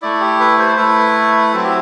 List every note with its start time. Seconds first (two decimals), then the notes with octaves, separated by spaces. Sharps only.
0.02 A3 E4 D5
0.21 G4
0.40 B4
0.58 C5
0.77 A3 E4 B4
1.53 F#3 C4 E4 A4
1.64 G4